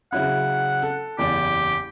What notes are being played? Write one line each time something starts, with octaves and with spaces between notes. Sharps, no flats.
C#3 F#3 E4 F#5
A4
F#1 E2 G4 D5